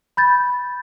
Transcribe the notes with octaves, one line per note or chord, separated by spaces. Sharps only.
B5 G6 A6